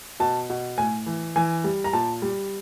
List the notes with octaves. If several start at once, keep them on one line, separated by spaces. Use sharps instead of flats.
B2 A5
B2
A2 G#5
E3
E3 G#5
G3
A#5
A#2 A5
G3